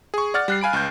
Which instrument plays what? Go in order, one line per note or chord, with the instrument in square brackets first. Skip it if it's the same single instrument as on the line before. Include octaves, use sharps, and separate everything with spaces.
[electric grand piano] G#4 C#6
D5 F#5 F6 A6
G3 F#6 C7
F5 G#5 B5 D7
C#2 G6